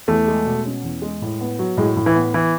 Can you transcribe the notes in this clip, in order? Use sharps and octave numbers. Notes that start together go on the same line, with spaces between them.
E2 A3
G#3
B2
C#4
E2
G#3
A2
B3
F#3
A2 G#3
A2
E3
B3
E3